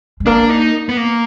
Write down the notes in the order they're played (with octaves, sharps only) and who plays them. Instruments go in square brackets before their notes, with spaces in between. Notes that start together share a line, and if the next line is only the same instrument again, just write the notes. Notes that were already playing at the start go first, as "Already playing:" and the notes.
[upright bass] G#3
[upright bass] A#3 [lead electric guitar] D4
[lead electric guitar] D#4
B3
A#3